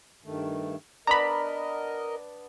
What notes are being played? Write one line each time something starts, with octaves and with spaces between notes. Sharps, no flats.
G2 D#3 A3
B3 D4 A#4 D#5 A#5 B5